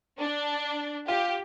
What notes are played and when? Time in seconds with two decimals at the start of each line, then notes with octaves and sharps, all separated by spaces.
0.19 D4
1.08 F4 G4